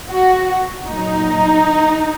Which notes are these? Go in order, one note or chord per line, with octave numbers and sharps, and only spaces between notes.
F#4
A#2 F#3 D#4